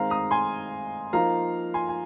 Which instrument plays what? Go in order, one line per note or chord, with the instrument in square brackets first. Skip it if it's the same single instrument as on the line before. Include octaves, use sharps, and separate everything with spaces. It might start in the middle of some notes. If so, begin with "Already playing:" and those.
Already playing: [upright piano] D#3 G#3 C4 F5 A#5
A#5 D#6
G#5 C6
F3 A#3 D#4 F5 A#5
G#5 C6
G#5